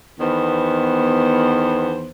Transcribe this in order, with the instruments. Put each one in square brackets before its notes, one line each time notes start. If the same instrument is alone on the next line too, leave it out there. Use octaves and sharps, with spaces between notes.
[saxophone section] E2 D#3 B3 C5